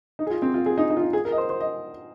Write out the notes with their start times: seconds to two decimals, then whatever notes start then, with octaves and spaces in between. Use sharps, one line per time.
0.19 D#4
0.27 G#4
0.30 F4
0.42 C4
0.54 F4
0.66 G#4
0.78 D#4
0.90 D#4
0.97 F4
1.01 D#4
1.13 G#4
1.25 A#4
1.32 D#5
1.38 C5
1.50 C5
1.61 D#5